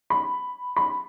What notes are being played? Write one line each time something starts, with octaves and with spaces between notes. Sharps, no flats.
B5
B5